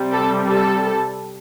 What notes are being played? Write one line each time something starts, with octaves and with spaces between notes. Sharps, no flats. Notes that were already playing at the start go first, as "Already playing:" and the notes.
Already playing: C3 G3
A4
A4